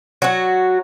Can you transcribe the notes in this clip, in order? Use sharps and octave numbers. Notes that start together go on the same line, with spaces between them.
F#3 F#4